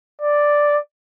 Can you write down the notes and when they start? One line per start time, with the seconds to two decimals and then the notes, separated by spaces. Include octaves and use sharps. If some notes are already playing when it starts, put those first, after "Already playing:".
0.21 D5